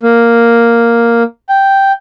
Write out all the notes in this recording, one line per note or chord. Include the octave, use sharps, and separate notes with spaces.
A#3
G5